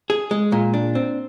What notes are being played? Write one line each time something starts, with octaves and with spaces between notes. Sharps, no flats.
G#4
G#3
A#2
D4
C4